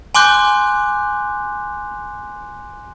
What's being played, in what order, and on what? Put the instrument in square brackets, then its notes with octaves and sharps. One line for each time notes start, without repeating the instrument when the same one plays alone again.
[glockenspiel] G#5 C6 D6 F#6 G6